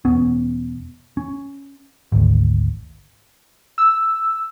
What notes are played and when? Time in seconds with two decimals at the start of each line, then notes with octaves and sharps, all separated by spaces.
0.05 E1 B3 C#4
1.17 C#4
2.12 G#1 D2
3.78 E6